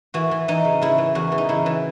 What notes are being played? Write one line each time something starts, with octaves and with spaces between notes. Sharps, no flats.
E3 F#4
E3
E3 D#4
C#3
C#3 E4
E3
E2 F#4
E3
D#4
C#3 E4
E3